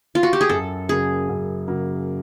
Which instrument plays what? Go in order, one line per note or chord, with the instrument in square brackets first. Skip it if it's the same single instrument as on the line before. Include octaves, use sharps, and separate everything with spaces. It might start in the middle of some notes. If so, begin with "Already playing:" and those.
[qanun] F4
F#4
G4
G#4
[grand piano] F#2 [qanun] A4
[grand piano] C#3 F#3 A#3 [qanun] G#4
[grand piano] F#2
C#3 F#3 A#3